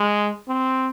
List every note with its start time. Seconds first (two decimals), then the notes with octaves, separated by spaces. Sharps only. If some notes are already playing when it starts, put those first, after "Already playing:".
Already playing: G#3
0.48 C4